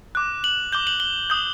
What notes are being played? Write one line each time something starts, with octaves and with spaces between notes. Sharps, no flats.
D6 F#6
F#7
D6 G6 G7
F#7
G7
D#6 G6